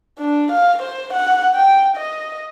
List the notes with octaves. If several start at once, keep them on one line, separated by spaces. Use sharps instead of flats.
D4
F5
C5
F#5
G5
D#5